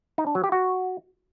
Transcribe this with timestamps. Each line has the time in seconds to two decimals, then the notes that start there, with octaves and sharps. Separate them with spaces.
0.18 D#4
0.27 D4
0.35 F#3
0.44 G4
0.52 F#4